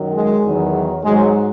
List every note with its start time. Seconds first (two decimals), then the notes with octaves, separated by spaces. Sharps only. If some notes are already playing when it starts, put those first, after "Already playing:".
Already playing: F#2 D#3 F#3
0.13 G#3
0.43 E2 D#3 F#3
1.05 G#2 F#3 G#3